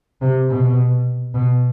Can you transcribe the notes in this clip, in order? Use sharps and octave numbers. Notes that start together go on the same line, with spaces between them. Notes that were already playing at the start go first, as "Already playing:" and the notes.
C3
B2
B2